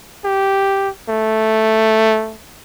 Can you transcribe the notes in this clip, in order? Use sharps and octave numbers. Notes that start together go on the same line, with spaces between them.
G4
A3